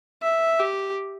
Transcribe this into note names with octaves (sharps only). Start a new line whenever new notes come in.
E5
G4